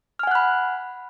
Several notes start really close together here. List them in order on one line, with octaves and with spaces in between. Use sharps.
F6 G#5 F#5 F#6 B5